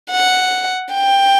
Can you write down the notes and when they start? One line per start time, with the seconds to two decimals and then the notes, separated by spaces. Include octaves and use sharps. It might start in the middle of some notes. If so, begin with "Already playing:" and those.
0.10 F#5
0.93 G5